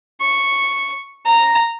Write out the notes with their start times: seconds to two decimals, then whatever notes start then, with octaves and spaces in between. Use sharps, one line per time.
0.21 C#6
1.26 A#5